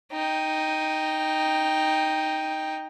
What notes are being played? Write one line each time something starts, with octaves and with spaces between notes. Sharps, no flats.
D#4 G5